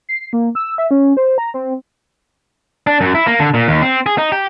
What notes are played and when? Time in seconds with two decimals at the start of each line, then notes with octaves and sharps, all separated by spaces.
0.09 C7
0.33 A#3
0.55 E6
0.78 E5
0.91 C#4
1.17 C5
1.38 A#5
1.54 C4
2.87 D4
3.01 F#2
3.15 E4
3.27 A#3
3.39 D3
3.54 A#2
3.68 D#2
3.82 C4
4.06 G#4
4.18 D#4
4.32 G4